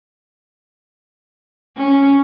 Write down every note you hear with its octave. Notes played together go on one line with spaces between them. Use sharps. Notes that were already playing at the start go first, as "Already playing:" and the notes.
C#4